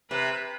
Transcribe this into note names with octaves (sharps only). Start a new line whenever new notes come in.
C3 B4